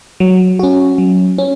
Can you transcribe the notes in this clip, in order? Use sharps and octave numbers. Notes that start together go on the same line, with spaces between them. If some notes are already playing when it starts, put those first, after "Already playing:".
F#3
C#4 F#4
F#3
C#4